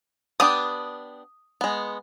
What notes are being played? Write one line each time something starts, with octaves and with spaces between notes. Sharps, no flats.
B3 D4 G4 D#6
G#3 B3